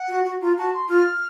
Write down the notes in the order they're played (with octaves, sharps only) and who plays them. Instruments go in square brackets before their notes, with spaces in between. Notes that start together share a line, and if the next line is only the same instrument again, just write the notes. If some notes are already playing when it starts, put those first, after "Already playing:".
Already playing: [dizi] F#5
[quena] F#4
F#4
[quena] F4 [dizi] A#5
[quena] F#4 [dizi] A5
[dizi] C6
[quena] F4 [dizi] F6